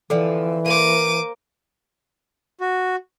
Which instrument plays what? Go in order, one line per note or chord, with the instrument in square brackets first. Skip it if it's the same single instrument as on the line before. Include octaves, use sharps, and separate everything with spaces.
[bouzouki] D3 F3 C4 [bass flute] E3 [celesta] A4 D5
[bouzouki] A#3 A#4 C5 [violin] D6 D#7
[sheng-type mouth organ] F#4